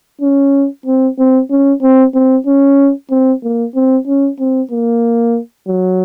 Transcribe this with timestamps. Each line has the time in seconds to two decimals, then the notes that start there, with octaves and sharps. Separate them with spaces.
0.21 C#4
0.86 C4
1.19 C4
1.50 C#4
1.82 C4
2.14 C4
2.47 C#4
3.11 C4
3.43 A#3
3.75 C4
4.07 C#4
4.39 C4
4.71 A#3
5.67 F#3